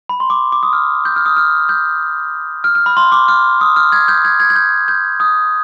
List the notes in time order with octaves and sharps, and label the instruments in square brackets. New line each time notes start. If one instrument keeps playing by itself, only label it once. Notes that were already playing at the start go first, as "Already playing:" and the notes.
[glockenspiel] B5
C6
D6
D6
D#6
F6
G6
F6
D#6
F6
G6
F6
F6
B5
C6
D6
F6
D#6
F6
G#6
G6
G#6
G#6
G#6
G6
G6
D#6